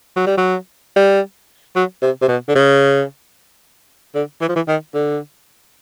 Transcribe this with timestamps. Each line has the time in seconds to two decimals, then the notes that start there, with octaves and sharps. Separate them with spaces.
0.16 F#3
0.27 G3
0.37 F#3
0.96 G3
1.76 F#3
2.02 C3
2.22 C3
2.28 B2
2.48 D3
2.55 C#3
4.15 D3
4.41 E3
4.49 F3
4.56 E3
4.68 D#3
4.94 D3